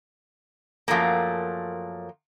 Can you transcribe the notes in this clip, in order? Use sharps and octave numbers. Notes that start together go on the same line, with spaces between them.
F#2 F3 F#3 A3 A#3